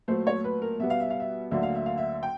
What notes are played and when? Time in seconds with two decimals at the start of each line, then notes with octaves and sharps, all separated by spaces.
0.08 A#2 F#3 A3 C5
0.27 C#5
0.44 B4
0.62 A#4
0.79 B2 G3 B3 E5
0.90 F5
1.00 E5
1.10 F5
1.20 E5
1.51 D2 D3 F#3 A#3 E5
1.63 F5
1.75 E5
1.86 F5
1.98 E5
2.23 G5